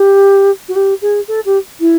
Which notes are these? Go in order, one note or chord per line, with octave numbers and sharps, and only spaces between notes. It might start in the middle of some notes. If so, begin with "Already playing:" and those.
Already playing: G4
F#4
G4
G#4
A4
G4
E4